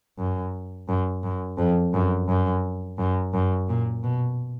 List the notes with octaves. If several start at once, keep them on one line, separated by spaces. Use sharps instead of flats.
F#2
F#2
F#2
F2
F#2
F#2
F#2
F#2
A#2
B2